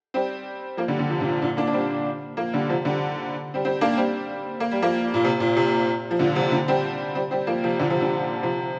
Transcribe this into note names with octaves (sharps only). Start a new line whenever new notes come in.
G3 C4
F3 A#3
D3 G3
D3 G3
C3 F3
A#2 D3
A#2 D3
A#3 D4
D4
G3 C4
F3 A#3
D3 G3
C3 F3
D3 G3
G3 C4
G3 C4
A#3 D4
G3 C4
A#3
G3
F3 A#3
A#2
C3
A#2
C3
F3
A#2 D3
C3 F3
D3 G3
G3 C4
G3 C4
G3 C4
F3 A#3
C3 F3
A#2 D3
C3 F3
D3 G3
C3 F3